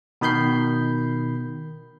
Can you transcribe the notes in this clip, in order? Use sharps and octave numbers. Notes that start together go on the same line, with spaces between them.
B2 D#3 B5 G6 C7